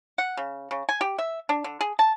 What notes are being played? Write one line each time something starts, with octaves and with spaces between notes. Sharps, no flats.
F#5
C#3
C#3
G#5
G4
E5
D4
D3
G#4
A5